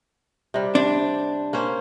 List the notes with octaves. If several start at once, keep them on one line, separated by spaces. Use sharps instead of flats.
C3 G3
D4 C5
A#3 C#4 C5